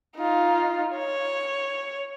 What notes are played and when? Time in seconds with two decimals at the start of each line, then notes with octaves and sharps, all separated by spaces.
0.18 D#4 F4
0.96 C#5